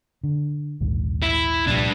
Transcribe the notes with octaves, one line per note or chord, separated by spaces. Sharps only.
D3
A#1 D#2 G#2
E4
C2 A#2 F3 G3 D4